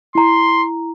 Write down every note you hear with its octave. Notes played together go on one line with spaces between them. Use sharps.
E4 A#5 C6